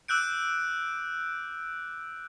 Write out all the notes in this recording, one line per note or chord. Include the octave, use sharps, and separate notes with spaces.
D6 E6 F#6 G6 D7